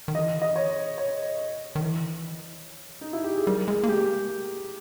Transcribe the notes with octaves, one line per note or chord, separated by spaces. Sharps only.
D#3
E3 D#5
D#5
C#5
C#5
D#3
E3
D#4
E4
G4
G#4
G3 A#4
G#3 G#4
A#3
G#3 G4